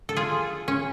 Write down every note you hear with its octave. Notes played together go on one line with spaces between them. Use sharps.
A4
F4 G#4
C#4